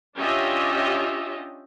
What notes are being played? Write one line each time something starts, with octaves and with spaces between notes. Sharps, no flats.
C#4 D4 F4 G4 D#5 E5